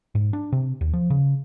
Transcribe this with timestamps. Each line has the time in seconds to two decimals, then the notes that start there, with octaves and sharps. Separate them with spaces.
0.15 G#2
0.33 D4
0.52 C3
0.81 D#2
0.93 F3
1.10 C#3